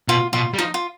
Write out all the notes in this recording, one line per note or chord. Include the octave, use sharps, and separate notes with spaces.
B2 F4
B2 F4
G3
F3 D#4
F4